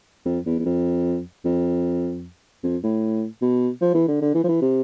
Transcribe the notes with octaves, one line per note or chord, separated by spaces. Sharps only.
F2
E2
E2
F2
F2
F2
A2
B2
F3
E3
D3
D3
E3
F3
E3
C3